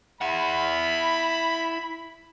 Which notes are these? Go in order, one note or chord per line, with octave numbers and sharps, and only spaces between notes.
E4 F#5 B5